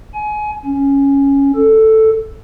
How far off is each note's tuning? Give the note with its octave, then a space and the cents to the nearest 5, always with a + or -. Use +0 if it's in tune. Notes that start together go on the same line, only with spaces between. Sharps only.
G#5 +25
C#4 +0
A4 +5